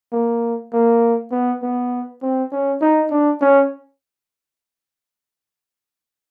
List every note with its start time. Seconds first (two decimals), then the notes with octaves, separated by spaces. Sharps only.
0.13 A#3
0.73 A#3
1.32 B3
1.63 B3
2.22 C4
2.52 C#4
2.81 D#4
3.11 D4
3.41 C#4